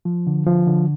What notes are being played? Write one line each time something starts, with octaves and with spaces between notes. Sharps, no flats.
F3
D3
F3
D3